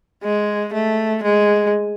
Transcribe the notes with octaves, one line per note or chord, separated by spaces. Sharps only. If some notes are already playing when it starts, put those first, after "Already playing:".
G#3
A3
G#3